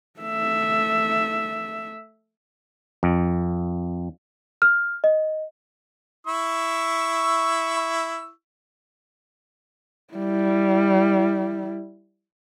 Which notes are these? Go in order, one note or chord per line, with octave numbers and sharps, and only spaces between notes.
A3 E5
F2
F6
D#5
E4 C#6 E6
G3 E4